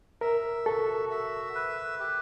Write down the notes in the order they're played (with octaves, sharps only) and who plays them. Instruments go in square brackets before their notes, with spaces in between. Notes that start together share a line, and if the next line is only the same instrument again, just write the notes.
[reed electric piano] A#4 [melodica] E5
[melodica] F#4 [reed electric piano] A4
[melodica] E5
B4
G4